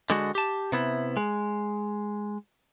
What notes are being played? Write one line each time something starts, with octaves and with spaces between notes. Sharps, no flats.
D3 G#3 F#4
G4 A5
C3 B3 E4
G#3